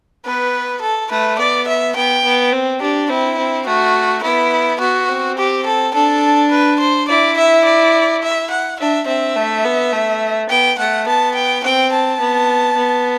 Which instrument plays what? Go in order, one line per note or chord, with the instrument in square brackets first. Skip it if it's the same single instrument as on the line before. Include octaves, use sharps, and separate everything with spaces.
[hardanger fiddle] B3 [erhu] B4
[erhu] A4
[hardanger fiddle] A3 [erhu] B4
[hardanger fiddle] B3 [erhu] D5
[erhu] E5
[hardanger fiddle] B3 [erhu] G5
[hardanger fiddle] B3
C4
[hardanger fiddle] D4 [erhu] G4
[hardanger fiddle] C4 [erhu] E4
[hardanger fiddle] C4
[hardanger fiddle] A3 [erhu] F#4
[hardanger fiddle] B3 [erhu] E4
[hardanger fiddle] B3 [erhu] F#4
[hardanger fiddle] C4
[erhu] G4
A4
[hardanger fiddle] D4 [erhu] A4
[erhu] B4
C5
[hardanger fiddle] E4 [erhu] D5
[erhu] E5
D5
E5
F#5
[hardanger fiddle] D4 [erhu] E5
[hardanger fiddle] C4 [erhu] E5
[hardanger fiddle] A3
B3
A3
[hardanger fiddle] B3 [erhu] G5
[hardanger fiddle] A3 [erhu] F#5
[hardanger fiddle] B3 [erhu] A5
[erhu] G5
[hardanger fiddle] C4 [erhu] G5
[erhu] A5
[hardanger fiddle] B3
B3